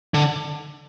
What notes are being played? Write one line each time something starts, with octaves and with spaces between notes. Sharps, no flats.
D3